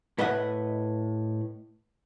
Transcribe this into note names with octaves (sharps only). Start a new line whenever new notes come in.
A2 B4 D#5 E5 F#5